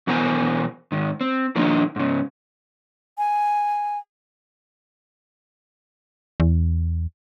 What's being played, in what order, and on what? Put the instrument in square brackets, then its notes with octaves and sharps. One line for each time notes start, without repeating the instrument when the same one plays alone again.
[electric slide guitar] B2 E3 B3 A#4 C5 G#5
G#2 D#3
C4
A#2 D#3 F3 A#3 D4 D#4
G#2 C#3
[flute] G#5
[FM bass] E2